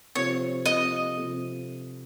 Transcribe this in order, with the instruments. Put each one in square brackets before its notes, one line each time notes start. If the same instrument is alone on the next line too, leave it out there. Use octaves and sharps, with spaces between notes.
[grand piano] C3 F3 C4 F4 A4 [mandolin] C#5
[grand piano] C3 F3 C4 F4 A4 [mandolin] D#5
[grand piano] C3 F3 C4 F4 A4